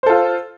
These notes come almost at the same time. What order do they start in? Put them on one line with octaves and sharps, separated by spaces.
C5 A4 F4